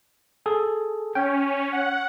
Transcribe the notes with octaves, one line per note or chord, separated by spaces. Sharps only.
G#4 A4
C#4 G5
F#5